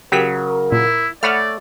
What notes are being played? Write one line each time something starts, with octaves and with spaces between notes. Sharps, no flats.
C#3 F#3 G4 A#4 B6
A#2 E4
A3 C#5 D5 F#5 B5 F6